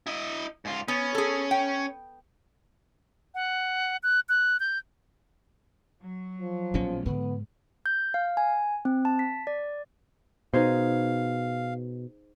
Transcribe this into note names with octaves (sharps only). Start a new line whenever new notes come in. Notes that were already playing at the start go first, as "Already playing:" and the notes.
E4 D#5
G#2 F4
B3 C#4
G#4 A4
G5
F#5
F#6
F#6
G6
F#3
F3
A#1 B2 G#3 C#4
G#2 D3 B3
G6
F5
G#5
C4
A5
B6
D5
B2 D#4 G#4 C5 F5